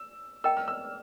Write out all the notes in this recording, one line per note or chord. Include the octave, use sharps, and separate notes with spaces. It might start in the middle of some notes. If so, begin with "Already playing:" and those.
Already playing: E6
A#4 D#5 G5 A#5 E6
F6
E6